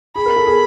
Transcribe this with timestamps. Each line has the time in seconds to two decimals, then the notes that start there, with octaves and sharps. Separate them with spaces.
0.16 G#4 B5
0.26 A#4
0.36 A4
0.47 G#4